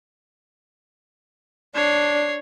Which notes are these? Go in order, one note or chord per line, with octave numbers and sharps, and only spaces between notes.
D4 C#5 C7